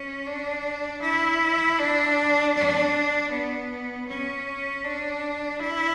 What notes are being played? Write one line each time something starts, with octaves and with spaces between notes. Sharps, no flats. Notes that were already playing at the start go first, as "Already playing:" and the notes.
Already playing: C#4
D4
E4
D4
D4
B3
C#4
D4
E4